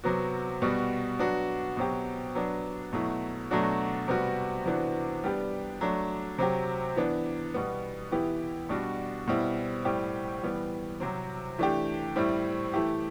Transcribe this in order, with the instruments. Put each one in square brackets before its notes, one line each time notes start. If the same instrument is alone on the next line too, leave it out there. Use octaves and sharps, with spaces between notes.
[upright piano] C3 F#3 B3 F#4
B2 G3 B3 F#4
F#3 B3 D4 F#4
B2 F#3 C4 G4
F#3 B3 D4
B2 F#3 A3 E4
B2 F#3 A3 D4 F#4
C3 G3 B3 F#4
C3 E3 B3 D4 F#4
G3 B3 D4 G4
F#3 A3 D4
C3 F#3 C4 G4
E3 B3 D4
B2 G3 B3
E3 B3 E4 G4
B2 G3 D4 F#4
B2 G3 C4 E4
A2 G3 C4 G4
E3 G3 B3
C3 F#3 C4
E3 A3 D4 G4
A2 G3 C4 E4
E3 A3 E4 G4